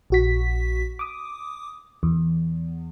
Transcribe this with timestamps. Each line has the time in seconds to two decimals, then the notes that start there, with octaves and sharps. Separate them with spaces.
0.10 A#1 F#4 B6
0.99 D6 D#6
2.03 E2